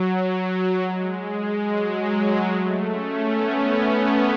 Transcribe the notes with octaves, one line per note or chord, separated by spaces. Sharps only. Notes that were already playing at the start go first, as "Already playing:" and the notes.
Already playing: F#3
G#3
F#3
G#3
A3
C#4
B3